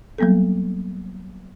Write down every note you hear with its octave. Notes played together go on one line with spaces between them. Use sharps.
F#3 G3 A#3 B3 A4